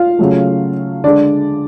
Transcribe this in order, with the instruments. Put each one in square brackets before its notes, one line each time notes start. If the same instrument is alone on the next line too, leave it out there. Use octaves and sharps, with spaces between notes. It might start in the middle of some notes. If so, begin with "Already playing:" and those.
Already playing: [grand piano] F4 F5
C#3 F#3 A3
D3 G#3 D4 D5